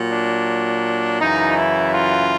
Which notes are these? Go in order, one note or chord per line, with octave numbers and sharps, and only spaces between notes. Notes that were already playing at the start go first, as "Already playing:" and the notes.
Already playing: A#2 F#3
D4
F#2 C#3 E3 D#4
E4
F4